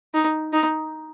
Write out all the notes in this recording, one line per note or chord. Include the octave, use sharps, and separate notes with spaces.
D#4
D#4